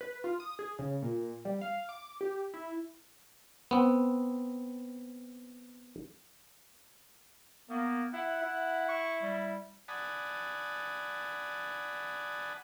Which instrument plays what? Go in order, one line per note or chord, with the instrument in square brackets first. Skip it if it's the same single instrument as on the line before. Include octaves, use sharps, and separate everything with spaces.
[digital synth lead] B4
F4
D#6
G#4
C#3
A#2
G3
F5
D6
G4
E4
[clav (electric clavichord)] B3 C4
[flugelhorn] A#3 [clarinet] B3
[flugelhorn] E4 [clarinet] F#5
[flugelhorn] E4
[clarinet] C#6
G3
[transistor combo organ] D5 F#5 G#5 A5 B5 D#6